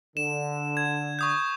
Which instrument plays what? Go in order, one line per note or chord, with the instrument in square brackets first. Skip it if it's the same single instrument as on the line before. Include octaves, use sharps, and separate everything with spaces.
[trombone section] D3 [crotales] E7
[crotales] G#6
C#6 D#6 G6